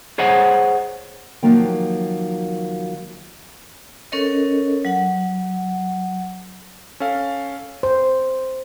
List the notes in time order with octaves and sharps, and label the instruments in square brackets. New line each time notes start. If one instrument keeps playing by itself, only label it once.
[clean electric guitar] G#4 C5 C#5 D#5 F#5
[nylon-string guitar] D#3 F3 F#3 A#3 G5
[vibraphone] C#4 A4 A#4 C#5 D#5
F#3 F#5
[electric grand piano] C#4 A4 F5
[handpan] C5